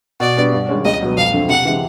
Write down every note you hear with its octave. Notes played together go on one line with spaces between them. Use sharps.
B2 D5
G3 B3 D4
G2
D#3 G#3 C#4
C#2 D#5
B2 F#3 B3
F2 F5
D3 F3 A3 C4
C3 F#5
E3 G#3